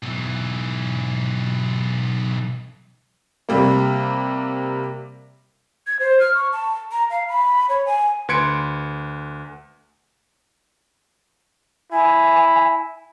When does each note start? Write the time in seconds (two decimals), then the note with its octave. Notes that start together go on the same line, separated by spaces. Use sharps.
0.03 B1 E3
3.49 C3 G3 A#3
5.87 G#6
6.00 C5
6.20 F6
6.34 C#6
6.53 A5
6.92 A#5
7.10 F5
7.28 B5
7.69 C#5
7.86 G#5
8.28 D2 B4 C6 G#6 C#7 D7
11.92 E4 G#5